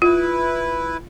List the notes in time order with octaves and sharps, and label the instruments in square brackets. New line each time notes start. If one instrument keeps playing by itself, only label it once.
[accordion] E4 B4 [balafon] F4